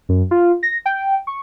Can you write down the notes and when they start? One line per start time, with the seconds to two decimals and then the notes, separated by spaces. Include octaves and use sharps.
0.09 F#2
0.31 F4
0.63 A#6
0.86 G5
1.27 C#6